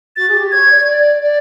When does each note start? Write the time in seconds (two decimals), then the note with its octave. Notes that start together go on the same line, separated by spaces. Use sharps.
0.16 F#4 A6
0.28 G#4
0.34 G4
0.51 C#5 G#6
0.70 D5
0.86 D5
1.22 D5